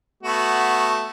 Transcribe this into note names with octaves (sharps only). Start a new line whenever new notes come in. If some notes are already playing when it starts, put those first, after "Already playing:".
A3 B3 F#4